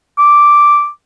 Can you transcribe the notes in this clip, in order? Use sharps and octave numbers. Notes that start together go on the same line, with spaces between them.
D6